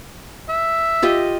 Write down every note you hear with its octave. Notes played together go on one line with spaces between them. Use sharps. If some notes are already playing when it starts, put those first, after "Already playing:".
E5
F4 G4 D#5